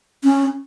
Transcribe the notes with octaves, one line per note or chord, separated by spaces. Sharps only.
C#4